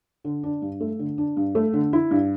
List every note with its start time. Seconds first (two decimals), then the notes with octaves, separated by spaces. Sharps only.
0.24 D3
0.43 D4
0.62 G2
0.80 A3
0.99 D3
1.18 D4
1.37 G2
1.55 A3
1.73 D3
1.93 E4
2.11 G2